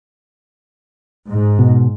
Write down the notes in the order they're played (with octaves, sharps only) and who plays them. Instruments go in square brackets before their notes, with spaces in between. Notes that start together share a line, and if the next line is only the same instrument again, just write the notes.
[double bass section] G#2
[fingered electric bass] B2